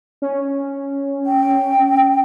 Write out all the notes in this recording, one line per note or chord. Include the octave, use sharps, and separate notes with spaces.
C#4
G5